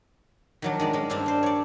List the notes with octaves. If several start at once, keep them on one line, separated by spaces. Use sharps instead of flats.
D#3 F#3 D4
D#3 G#3 D5
G#3 C#4
G2 G3 A#3 C4 D4
C4 C5
C#5 D5